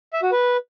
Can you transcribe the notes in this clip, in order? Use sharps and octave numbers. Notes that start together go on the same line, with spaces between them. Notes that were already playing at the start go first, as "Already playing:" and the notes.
E5
F#4
B4